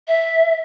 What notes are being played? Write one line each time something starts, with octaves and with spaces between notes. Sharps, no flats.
E5